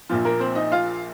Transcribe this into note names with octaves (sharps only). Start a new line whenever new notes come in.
A#1 A#2 F3 F4
A#3 A#4
C4 C5
D#4 D#5
F4 F5